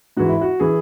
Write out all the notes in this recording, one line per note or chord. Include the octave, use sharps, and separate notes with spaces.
G#2 E3 F#4
E4
F#4
E3 G#4